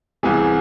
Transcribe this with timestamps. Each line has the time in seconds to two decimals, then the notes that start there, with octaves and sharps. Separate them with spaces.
0.23 C2 C3 E3 G#4